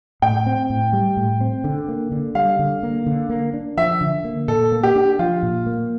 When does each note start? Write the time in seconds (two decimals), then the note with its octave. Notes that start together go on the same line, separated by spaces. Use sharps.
0.22 A2 G5
0.46 C4
0.70 A2
0.93 G3
1.17 A2
1.41 C4
1.64 D3
1.88 A#3
2.12 D3
2.35 G3 F5
2.59 D3
2.83 A#3
3.06 D3
3.30 A#3
3.54 D4
3.77 F3 E5
4.01 D3
4.24 A#3
4.48 A#2 A4
4.72 A#3
4.83 G4
4.96 D4
5.19 F3 F4
5.43 A#2
5.66 A#3